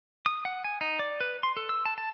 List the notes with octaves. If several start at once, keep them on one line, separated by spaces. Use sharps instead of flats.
D#6
F#5
G#5
D#4
D5
B4
C6
A4
E6
A5
A5